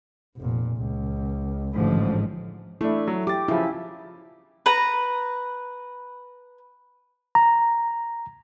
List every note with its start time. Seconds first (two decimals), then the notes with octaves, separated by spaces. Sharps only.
0.36 F1 A#2
0.77 C#2
1.73 A1 G#2 D3 F3
2.81 A3 D4 E4
3.07 F#3
3.27 G4 D6 A6
3.48 C#3 F3 E4
4.66 B4 A#5
7.35 A#5